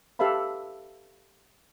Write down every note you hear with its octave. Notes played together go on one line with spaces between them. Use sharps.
G4 A4 B4 E5 F5 B5